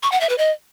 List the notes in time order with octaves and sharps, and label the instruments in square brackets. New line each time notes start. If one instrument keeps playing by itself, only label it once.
[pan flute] C#6
F#5
E5
B4
D#5